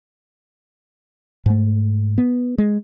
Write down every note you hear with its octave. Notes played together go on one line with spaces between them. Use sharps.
G#2 A3
B3
G#3